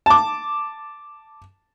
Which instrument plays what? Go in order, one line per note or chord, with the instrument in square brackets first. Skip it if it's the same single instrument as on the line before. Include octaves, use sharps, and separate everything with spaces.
[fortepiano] A5 D6